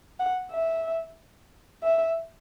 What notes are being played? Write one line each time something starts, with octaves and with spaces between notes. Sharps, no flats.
F#5
E5
E5